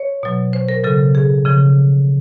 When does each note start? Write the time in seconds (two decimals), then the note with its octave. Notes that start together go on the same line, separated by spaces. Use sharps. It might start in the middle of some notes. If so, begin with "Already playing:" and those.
Already playing: C#5
0.23 B2 F#3
0.53 C5
0.68 A#4
0.84 C#3 F#3 A4
1.15 G#4
1.45 C#3 F3